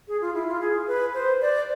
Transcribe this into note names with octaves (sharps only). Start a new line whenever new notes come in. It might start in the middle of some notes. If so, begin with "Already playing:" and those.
G#4
F4
E4
F4
G#4
B4
C5
D5